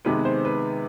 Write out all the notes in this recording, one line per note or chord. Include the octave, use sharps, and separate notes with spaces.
C3 D#3 G#3 B3 B4
C5
B4